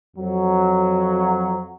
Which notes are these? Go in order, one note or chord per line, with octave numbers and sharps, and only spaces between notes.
F2 F#3